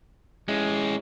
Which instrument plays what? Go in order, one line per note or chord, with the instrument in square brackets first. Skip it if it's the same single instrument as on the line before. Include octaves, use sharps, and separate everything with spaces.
[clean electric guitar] G#3 [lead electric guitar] C#4 E4